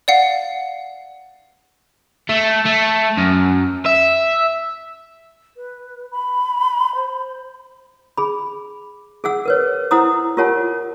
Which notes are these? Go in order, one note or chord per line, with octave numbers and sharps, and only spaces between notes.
D5 F5 F#5 C7
A3
A3
F#2
E5
B4
B5
C5
G#4 B5
G#4 F5 F#5 E6
A#4 B4 C#5
E4 C5 F#5 A#5 D#6 E6
F4 G4 A#4 C#5 F#5 A5